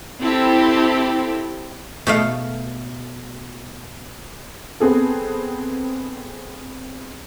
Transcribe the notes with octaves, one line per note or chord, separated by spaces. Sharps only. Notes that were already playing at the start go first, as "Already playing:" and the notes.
C4 E4 G4 A4
B2 A3 F5
B3 C4 G#4 A4